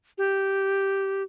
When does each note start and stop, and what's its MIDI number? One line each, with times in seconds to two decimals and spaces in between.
0.18 1.23 67